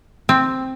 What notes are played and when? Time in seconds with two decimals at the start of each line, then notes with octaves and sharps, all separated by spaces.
0.29 C4